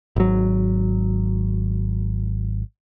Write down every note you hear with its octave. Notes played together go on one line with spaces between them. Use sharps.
G#1 F#3